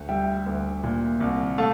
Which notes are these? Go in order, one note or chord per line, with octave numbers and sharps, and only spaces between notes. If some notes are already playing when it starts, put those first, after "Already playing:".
Already playing: D2
G3 E5 G5
D2
A#2
C2
A3 F5 A5